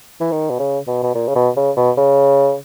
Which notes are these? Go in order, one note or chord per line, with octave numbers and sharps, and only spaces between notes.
E3
D#3
B2
C#3
B2
B2
A#2
C#3
B2
C#3
B2
C#3